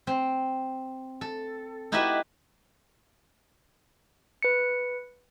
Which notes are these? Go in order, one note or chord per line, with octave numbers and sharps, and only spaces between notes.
C4
A4
D#4 E4 F#4 G4 B4 E5
B4 C#7